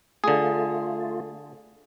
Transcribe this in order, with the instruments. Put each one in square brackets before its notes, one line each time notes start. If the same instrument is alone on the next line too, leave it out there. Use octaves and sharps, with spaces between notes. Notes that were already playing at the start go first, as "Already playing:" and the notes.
[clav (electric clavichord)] D3 G#4 [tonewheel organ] A3 F4